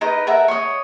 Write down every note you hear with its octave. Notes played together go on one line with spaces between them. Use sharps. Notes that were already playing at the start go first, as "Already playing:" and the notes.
D#4 A#4 B4 D#5
A4 A#4 E5 F#5
C#5 D#5